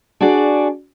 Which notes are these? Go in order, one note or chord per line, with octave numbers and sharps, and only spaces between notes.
D4 F#4 G#4 D5